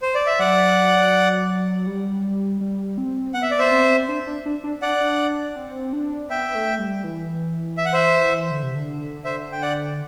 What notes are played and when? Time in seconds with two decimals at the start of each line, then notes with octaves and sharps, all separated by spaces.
0.02 C5
0.15 D5
0.27 E5
0.39 F#3 D5 F#5
1.87 G3
2.61 G3
2.98 C4
3.34 B3 F#5
3.42 E5
3.51 D5
3.59 C5 E5
3.71 C4
4.09 D4
4.27 D4
4.46 D4
4.64 D4
4.82 D4 D5 F#5
5.01 D4
5.56 C4
5.93 D4
6.29 B3 E5 G5
6.55 A3
6.79 G3
7.04 E3
7.78 E5
7.85 F#5
7.93 C5 E5
8.51 D3
8.63 C3
8.75 D3
9.24 C5 E5
9.52 G5
9.62 D5 F#5